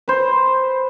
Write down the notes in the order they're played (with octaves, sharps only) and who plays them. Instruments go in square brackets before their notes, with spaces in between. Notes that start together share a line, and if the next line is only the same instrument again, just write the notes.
[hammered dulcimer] B4 C5